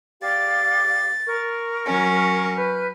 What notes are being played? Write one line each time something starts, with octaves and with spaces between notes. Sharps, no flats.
G4 D5 F5 A6
A#4 C#6
F#3 C#4
B4 F6 G6